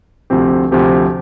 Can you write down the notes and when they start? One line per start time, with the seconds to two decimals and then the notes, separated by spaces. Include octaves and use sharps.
0.30 D2 C3 F3 C4 G4
0.71 D2 C3 F3 C4 G4